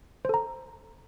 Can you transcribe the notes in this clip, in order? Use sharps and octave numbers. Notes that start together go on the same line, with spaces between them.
A4 C5 A#5